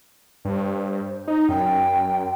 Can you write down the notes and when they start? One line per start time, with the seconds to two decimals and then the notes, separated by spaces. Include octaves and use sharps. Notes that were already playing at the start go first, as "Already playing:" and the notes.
0.45 G2 C5
1.28 D#4
1.49 F#2 G5